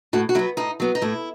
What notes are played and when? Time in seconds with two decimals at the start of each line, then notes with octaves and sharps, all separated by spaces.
0.13 A2 F#4
0.29 F#4
0.35 F#3 E4
0.39 B3
0.57 A2 D#4
0.80 F#3 B3
0.95 D#4
1.02 A2 E4